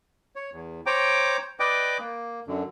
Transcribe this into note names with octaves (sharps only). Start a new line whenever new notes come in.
C#5
E2
C5 C#5 G5 A#5 D6
B4 D5 D#5 G5 D6
A#3
F#2 D3